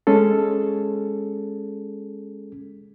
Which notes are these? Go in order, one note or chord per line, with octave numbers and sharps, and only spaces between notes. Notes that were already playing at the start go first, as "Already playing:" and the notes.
G#3 C#4 G#4 A4